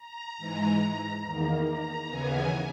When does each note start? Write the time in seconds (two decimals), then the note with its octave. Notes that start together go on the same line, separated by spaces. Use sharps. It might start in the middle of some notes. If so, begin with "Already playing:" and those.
Already playing: A#5
0.37 G#2 E3 G#3 A#5
1.23 E2 D#3 A#3
1.66 A#5
2.09 D#2 C#3 E3 B3 G#5